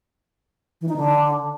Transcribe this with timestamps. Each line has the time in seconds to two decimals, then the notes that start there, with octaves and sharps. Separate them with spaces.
0.81 E3
0.89 D#4
0.96 D3